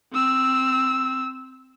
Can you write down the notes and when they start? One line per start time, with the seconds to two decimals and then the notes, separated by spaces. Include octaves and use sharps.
0.13 C4 E6